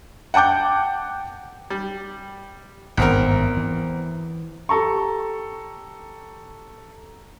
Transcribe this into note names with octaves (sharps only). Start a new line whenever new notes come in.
F#5 G5 A5 D6 G6
G3
G#1 E2 G2 D#3 C4 A#4
E3
G4 A4 A#5 C#6